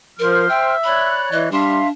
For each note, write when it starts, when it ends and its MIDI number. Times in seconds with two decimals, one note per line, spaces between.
0.19 0.45 53
0.19 0.45 70
0.19 0.75 72
0.19 0.75 84
0.19 0.75 89
0.49 1.16 76
0.49 0.74 79
0.84 1.50 73
0.84 1.50 74
0.84 1.29 83
0.84 1.50 90
1.32 1.49 52
1.32 1.49 75
1.51 1.81 55
1.51 1.91 62
1.51 1.87 76
1.51 1.87 77
1.51 1.87 84